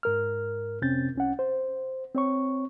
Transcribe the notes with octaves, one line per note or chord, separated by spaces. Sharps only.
G#2 A#4 F6
F2 C3 C4 C#4 G6 A6
C2 C#4 F#5
C5
C4 C#5 C#6